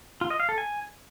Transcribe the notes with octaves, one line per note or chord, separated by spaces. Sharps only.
F4
D#5
F5
A4
G#5